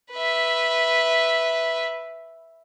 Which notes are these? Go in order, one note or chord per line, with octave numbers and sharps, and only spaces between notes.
B4 E5